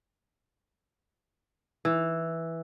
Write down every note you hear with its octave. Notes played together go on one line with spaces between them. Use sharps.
E3